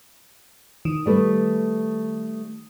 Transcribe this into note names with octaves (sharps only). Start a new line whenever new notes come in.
D#3
G3 A3 B4